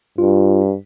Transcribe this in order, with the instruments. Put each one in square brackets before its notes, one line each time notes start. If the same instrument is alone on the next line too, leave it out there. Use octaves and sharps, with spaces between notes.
[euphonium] G2 [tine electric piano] F4